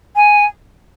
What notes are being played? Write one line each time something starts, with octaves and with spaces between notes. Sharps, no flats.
G#5